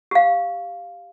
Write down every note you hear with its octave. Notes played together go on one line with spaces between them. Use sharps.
G4 F5